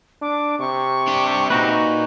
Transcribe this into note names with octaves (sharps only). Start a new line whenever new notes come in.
D4 D6
C3 C#6
D4 G4
A#2 D#4 F#4 B4